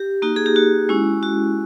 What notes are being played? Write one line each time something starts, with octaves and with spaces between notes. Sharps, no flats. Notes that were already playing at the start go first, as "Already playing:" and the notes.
Already playing: G4
A#3 D#4 F#4
G#4
G4
F#4
G#3 C#4 E4
F#4